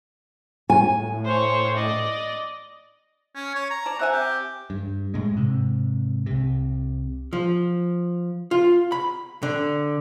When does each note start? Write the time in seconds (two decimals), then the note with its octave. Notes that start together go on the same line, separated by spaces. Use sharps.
0.70 A2 G#5
1.25 C5 C#5
1.75 D5 D#5
3.35 C#4
3.55 C#5
3.71 A#5
3.86 D5 A5
3.99 C4 E5 F#5 G#5
4.12 G4
4.70 G2
5.14 A2 G#3
5.37 G#2 C3
6.26 C2 C3
7.33 F3
8.51 F4
8.92 B5
9.43 D3